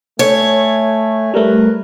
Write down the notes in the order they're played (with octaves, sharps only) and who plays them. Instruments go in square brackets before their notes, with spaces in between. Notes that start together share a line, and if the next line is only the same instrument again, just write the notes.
[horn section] A3 G#5 [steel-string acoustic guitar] C#5
[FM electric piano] G3 A3 [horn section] A#4 B4